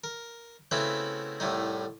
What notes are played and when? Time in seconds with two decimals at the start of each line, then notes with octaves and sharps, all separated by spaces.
0.04 A#4
0.71 C#3 A3 B3 C4 E4 F#4
1.40 C2 A2 A3 D#4